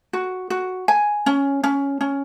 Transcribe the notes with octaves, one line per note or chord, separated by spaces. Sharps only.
F#4
F#4
G#5
C#4
C#4
C#4